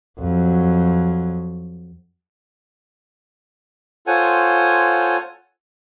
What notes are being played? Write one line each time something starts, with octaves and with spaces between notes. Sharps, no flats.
F2 F#3
F4 A4 C5 C#5 F#5 G#5